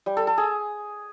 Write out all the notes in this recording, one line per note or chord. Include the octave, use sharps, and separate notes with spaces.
G3
A4
A4
G#4